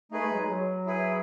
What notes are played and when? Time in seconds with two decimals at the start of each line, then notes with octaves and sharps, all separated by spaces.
0.11 A3 D#4 G#4 B4
0.21 G#3
0.31 F#3
0.40 G#3
0.49 F#3
0.86 E4 G#4 B4